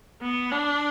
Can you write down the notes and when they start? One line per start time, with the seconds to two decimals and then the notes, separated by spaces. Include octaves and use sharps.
0.22 B3
0.52 D4